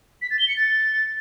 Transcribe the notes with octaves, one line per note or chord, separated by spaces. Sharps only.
B6
A6
G7
C#7
A6